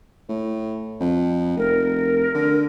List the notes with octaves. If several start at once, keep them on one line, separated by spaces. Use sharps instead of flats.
A2
F2
F1 A#4
D3